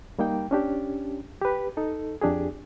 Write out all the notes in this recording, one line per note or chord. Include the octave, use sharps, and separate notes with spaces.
G3 A#3 D#4 G5
C#4 D4 G4
G4 B4
D#4 A4
F2 D4 G4 G#4